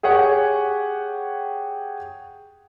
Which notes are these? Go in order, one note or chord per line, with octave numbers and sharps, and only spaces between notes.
G4 G#4 C#5 F#5 G5